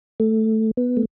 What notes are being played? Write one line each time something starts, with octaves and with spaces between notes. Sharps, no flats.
A3
B3
A3